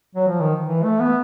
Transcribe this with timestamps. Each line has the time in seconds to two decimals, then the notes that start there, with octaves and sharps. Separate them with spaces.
0.15 F#3
0.28 F3
0.41 D#3
0.66 E3
0.83 A3
1.00 B3